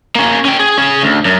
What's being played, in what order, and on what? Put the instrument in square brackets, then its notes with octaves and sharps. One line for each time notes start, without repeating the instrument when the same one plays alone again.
[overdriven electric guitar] A#3 C#4
C#4 G5
G#4
C#4 G#4
D2
F#2